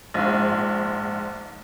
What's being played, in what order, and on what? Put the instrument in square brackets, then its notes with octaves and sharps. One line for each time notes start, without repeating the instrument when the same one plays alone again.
[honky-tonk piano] A#1 G#2